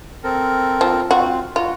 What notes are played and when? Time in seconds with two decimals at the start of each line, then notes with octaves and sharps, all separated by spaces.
0.24 C4 A4 A#4
0.81 F3
1.11 C4 F4 F#4
1.56 F4 F#4